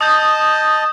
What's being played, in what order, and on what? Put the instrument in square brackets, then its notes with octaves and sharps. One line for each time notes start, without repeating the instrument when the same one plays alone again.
[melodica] D#5 A5 [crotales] D#6 G6